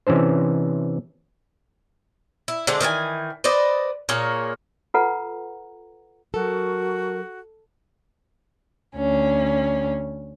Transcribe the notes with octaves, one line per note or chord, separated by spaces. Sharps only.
C3 E3 C#4 D4 C5
E4
D3 G#3 C4 D4
D#3 E3 B4 G#5
B4 C5 D5 D#5
A#2 A#3 G#4 C#5
F4 A4 B4 F#5 A#5
F#3 F#4 A4 A#4
D2 C#4